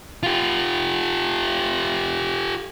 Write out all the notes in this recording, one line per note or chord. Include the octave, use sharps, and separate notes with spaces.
F4 G4